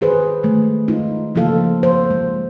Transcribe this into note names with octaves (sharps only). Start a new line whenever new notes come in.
D#3 G#4 B4 C5
D#3 G#3 A3
D#4 F4
C#3 F3 A#3 F4 A4 F5
C5
G#3